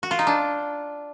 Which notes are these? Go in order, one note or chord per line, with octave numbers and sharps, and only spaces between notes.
F#4
F4
D#4
D4